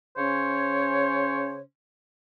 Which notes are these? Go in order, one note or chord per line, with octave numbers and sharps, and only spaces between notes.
C#3 C#4 C5 C#5